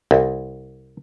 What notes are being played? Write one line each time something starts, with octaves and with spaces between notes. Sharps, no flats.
C2